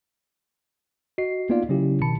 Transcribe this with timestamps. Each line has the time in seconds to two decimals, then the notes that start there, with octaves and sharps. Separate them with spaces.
1.18 F#4 D#5 C7
1.49 A#3 B3 D#4 F4 D5 F5
1.69 C#3 F#3 C#4 E4 G4
2.01 B2 D#3 A5 B5 C#7